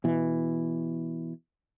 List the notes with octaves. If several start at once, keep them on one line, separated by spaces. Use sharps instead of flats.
B2 E3